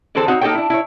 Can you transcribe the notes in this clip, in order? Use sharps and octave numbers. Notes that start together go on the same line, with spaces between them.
D3 E3 C4 G#4 A4 C5
C4 D#4 F#4 C#5 F#5
A#3 D#4 G4 A4 C#5 G5
D4 E4
E4 C#5